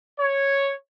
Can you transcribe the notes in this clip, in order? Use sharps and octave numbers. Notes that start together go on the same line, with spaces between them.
C#5